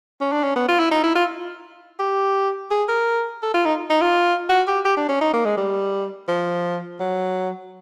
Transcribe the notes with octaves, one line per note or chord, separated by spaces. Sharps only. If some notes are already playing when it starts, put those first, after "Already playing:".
C#4
D4
C#4
B3
F4
E4
D#4
E4
F4
G4
G#4
A#4
A4
F4
D#4
D#4
F4
F#4
G4
G4
D4
C#4
D#4
A#3
G#3
G3
F3
F#3